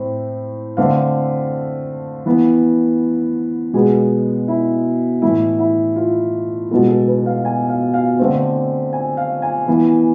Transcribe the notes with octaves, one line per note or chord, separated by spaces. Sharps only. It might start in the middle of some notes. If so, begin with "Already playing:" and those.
Already playing: A2 A3 C4
D3 A3 C4 F5
E3 B3
B2 G#3 B3 G#4
E4
A2 E3 A3 E4
E4
F4
B2 G#3 B3 A4
A4
B4
F5
G#5
F5
F5
D3 A3 C4
G#5
F5
G#5
E3 B3